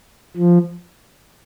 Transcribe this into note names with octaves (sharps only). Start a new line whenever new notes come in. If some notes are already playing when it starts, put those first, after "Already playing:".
F3